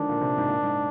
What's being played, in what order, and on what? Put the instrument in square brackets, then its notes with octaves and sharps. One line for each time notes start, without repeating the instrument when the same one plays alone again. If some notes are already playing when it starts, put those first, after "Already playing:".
Already playing: [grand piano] D3 D#3 F3 G#3 [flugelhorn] D4
[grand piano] A#2
C3
G#2
A#2
G#2